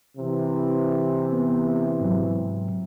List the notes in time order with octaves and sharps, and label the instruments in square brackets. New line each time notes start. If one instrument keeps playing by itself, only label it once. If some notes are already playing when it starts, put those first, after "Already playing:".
[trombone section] C3 E3
[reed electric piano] B3
G#2 F#3